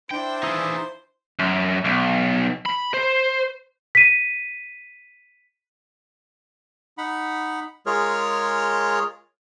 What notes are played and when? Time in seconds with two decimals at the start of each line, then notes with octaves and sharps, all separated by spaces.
0.11 D4 E4 C5 G5
0.43 E3 D#4 F4 G#4 E6
1.39 F#2
1.85 B1
2.66 B5
2.94 C5
3.95 B6 D#7
6.98 D#4 F#5 B5
7.86 G#3 F4 G#4 A#4 C#5 F6